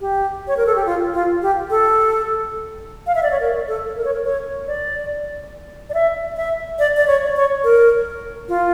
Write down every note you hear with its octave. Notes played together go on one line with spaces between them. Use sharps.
G4
C#5
A#4
A4
G4
F4
F4
G4
A4
F5
E5
D5
C#5
A#4
A4
A#4
C#5
A#4
C#5
D5
D5
E5
E5
D5
D5
C#5
C#5
A#4
F4